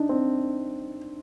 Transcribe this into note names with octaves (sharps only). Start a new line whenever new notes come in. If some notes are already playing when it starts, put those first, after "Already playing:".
Already playing: D4 D#4
C4